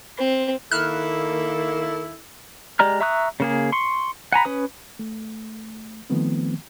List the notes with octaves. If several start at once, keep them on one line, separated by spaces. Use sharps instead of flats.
C4
D#3 A#3 E4 A4 F6 F#6
G#3 G4 D5 A#5 F6
E5 A#5 C#6 D#6 F#6
C#3 A#3 G#4
C6 C#6
F#5 G#5 A#5 B5
C#4 B4 D#6
A3
D#3 F3 A3 B3 C4